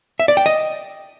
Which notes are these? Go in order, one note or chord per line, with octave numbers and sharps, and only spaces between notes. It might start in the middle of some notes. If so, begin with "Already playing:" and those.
E5
D5
G5
D#5